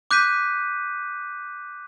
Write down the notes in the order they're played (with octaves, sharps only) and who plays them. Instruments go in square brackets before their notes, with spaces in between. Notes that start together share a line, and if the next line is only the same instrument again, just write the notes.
[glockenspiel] D6 F#6 G6 B6 D#7